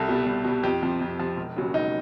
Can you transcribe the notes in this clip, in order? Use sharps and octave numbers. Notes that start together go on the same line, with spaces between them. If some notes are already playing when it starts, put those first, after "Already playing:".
Already playing: C2 A4
B2 G3
C2
B2 G3
F2 G4
C3 F3
F2
C3 F3
E1
D#2 C#3 F#3
E1 D#4